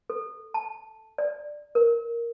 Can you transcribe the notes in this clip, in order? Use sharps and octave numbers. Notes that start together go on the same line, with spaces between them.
A4
A5
D5
A#4